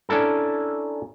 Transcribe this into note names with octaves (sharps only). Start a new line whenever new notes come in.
C#4 D4 E4 A4 A#4